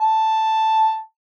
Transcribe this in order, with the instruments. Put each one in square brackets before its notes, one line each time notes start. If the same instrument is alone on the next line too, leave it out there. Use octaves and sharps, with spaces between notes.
[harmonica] A5